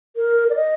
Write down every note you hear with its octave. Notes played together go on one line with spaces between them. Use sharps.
A#4
D5
D#5